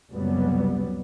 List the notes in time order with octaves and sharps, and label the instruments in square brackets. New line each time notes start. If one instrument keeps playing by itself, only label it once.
[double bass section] F#1 C#2 C3 F#3 G3 B3